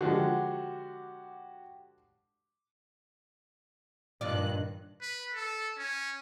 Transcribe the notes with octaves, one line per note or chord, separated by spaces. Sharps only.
D3 F3 G#3 F#4 G4
G2 A#2 D#3 F4 D5 F#6
B4
A4
C#4